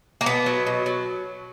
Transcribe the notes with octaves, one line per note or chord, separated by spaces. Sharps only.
A#3
B2 B3
F#3
B2
F#3